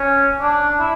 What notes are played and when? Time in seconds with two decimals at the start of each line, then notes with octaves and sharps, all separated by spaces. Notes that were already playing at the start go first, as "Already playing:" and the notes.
Already playing: C#4
0.41 D4
0.80 E4